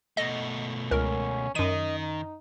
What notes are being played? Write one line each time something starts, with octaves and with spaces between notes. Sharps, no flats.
B2 A3 D#5
C#2 C#4 A#4
F#2 D#3 D#5 D#7
D#4